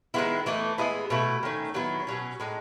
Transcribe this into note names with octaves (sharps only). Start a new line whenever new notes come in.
D#3 G#3 B3 E4
E3 A3 D#4
G#3 B3 E4 G#4
B2 A3 E4
D#3 A3 C#4
D#3 F#3 B3 E4
B2 F#3 C#4
A2 G#3 D#4